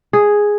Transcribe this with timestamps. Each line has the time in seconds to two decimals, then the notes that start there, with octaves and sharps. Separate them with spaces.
0.13 G#4